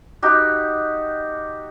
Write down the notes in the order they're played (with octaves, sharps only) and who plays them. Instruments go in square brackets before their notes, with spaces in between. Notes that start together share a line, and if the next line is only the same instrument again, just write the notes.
[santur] D#4 F#4 G4